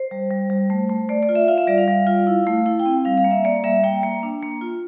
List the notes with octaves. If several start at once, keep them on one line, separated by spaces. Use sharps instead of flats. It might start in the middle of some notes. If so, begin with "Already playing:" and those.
Already playing: C5
G3
G3
G3
A3
A3
A3 D5
D5
F4
E5
F4 F5
E5
G3 D5
F5
G3
F4
E4
A3
E4
G5
C4
G3 F5
F5
A#3
E5
A#3 D5
G3 E5
A#3 G5
A#3
D4
A#3
F4